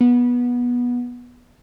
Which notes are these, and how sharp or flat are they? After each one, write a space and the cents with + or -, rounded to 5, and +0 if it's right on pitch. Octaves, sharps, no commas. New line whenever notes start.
B3 -20